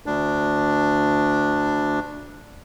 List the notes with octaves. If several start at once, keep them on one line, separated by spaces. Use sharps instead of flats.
D2 D4